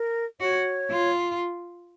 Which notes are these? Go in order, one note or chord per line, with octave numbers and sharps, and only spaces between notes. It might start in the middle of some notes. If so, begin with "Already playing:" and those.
Already playing: A#4
F#4 C#5
F4